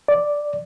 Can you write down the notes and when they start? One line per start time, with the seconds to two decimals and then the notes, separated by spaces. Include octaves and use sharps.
0.08 D5